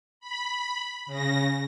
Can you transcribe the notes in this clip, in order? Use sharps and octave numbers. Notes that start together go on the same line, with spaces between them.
B5
C#3 A#6